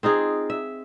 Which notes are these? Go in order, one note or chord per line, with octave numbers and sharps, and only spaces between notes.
C4 D#4 F4 G#4
E5